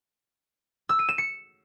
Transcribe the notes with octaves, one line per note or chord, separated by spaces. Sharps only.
E6
D#7
E7
C#7